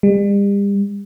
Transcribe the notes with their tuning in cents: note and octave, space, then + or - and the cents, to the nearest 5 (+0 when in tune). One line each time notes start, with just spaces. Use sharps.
G3 +40